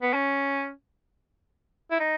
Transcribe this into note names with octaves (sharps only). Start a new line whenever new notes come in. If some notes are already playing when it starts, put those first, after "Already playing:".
B3
C#4
E4
D#4